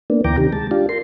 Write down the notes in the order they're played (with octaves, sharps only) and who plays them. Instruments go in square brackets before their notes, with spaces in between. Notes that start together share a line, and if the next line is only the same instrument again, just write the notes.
[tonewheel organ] A#3 B3 D4
D2 E3 G5 A#5 D6
C3 D#3 G4
G#3 A5
D4 F4 G4
A#4 C6